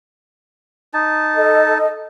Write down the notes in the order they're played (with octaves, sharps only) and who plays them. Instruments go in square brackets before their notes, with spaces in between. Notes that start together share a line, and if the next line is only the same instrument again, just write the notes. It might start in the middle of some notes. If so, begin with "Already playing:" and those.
[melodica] D#4 A5
[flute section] A4 D#5